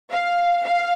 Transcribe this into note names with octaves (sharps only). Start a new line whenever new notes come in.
F5
F5